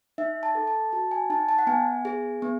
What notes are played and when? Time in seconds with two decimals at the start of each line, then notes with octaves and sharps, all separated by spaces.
0.18 D#4 E5
0.43 A5
0.55 A4
0.67 A5
0.92 F#4 A5
1.11 G#5
1.30 D#4 A5
1.49 A5
1.59 F#5
1.67 B3 G#5
2.05 G#4
2.42 B3